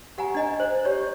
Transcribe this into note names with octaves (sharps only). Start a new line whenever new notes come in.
G4 F#5 G#5 A#5
D4 D#5 G#5
C5
G4 C#5 D5